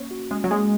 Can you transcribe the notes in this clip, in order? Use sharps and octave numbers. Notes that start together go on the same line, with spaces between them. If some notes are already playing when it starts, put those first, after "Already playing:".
Already playing: A#3 C#4 C#5
F#4
G#3 C#4
F#3
G#3 A#3